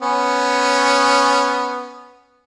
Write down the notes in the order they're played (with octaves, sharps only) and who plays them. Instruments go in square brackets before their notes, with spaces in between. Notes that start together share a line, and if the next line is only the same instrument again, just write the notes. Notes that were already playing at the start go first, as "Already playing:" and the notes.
[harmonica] B3 C#4